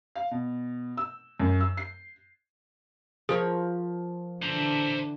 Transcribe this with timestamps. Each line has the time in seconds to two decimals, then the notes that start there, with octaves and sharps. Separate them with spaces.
0.15 F5
0.31 B2
0.97 E6
1.40 F#2
1.60 E6
1.77 C7
3.29 F3 G#4 A#4 C#5
4.42 D3 E3 C5 A#5